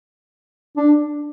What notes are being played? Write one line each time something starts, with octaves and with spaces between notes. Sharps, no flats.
D4